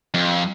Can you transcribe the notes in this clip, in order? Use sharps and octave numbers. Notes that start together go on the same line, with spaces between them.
F2